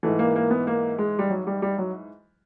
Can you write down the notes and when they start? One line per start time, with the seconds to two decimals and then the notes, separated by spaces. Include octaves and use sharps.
0.03 G#2 E3 A3
0.19 A#3
0.36 A#3
0.50 B3
0.67 A#3
0.98 G#3
1.19 G3
1.30 F#3
1.47 G3
1.62 G3
1.78 F#3